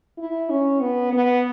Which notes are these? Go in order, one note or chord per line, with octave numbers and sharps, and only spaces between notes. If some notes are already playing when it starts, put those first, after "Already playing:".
E4
C#4
B3
B3